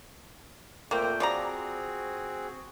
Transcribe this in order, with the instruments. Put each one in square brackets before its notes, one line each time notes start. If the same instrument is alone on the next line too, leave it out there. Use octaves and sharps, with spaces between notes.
[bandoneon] A#2 A3 G5 [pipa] A#3 C4
[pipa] F3 D5 A#5 [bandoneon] C4 F#4 G#4